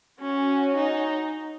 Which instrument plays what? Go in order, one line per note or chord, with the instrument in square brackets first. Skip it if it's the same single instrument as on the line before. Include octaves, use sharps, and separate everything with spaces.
[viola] C#4 [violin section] F#4 C#5 G#5
[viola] D#4